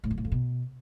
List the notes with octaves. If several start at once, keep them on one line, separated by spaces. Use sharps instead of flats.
A2
F#2
A2
F2
B2